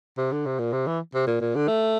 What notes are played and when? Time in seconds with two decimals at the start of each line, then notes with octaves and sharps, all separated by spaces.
0.18 C3
0.32 D3
0.46 C3
0.59 A#2
0.73 C3
0.87 E3
1.15 C3
1.27 A#2
1.41 A#2
1.55 D3
1.68 A3